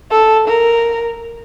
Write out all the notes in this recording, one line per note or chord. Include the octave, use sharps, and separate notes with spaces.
A4
A#4